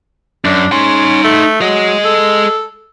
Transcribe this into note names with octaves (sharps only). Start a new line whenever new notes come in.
F#2 D4
C#4 D#4 C6
A3
F#3 G#4 D#5
A4